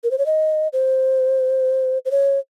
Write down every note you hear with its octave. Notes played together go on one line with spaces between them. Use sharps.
A#4
C5
C#5
D#5
C5
C5
C#5